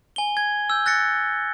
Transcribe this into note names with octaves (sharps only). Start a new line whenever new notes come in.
G#5 G7
G#6
E6 G6
F#6 A6 A#6 C#7